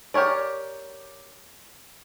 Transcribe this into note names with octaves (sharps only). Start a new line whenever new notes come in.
G4 A#4 C#5 D5